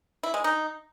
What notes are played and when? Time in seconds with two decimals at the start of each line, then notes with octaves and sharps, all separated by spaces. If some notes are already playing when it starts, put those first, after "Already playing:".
0.23 E4
0.34 G#3
0.44 D#4